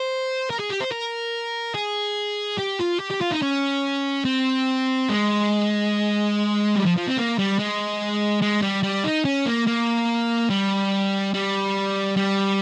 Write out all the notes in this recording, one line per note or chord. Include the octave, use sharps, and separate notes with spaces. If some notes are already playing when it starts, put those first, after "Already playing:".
Already playing: C5
A#4
G#4
G4
C5
A#4
G#4
G4
F4
G4
G4
F4
D#4
C#4
C4
G#3
G3
F3
F3
C4
A#3
G3
G#3
G#3
G3
G3
D#4
C#4
A#3
A#3
G3
G3
G3